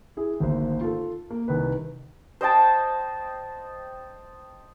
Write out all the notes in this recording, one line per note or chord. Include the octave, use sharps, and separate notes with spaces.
E4 G#4
G#1 D2 A#3 C5
F4 A4
A#3
C2 D#3 D#4 B4
C5 D#5 G5 A5